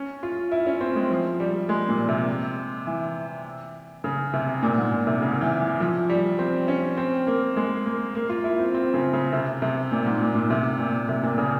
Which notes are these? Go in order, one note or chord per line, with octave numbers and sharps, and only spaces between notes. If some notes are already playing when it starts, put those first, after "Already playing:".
Already playing: C#4
F4
E4
C#4
C4
G#3
F3
G3
G#3
A#2
C3
E3
C#3
C3
A#2
G#2
A#2
C3
C#3
E3
E3
F3
G3
C4
C#4
C4
A#3
G#3
A#3
A#3
F4
E4
C4
C4
C#3
C#3
C3
C3
A#2
G#2
A#2
A#2
C3
A#2
C3
A#2
C#3